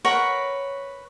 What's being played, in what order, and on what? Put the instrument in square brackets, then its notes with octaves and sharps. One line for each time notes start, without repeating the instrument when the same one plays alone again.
[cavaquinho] A#4 B4 C#5 F#5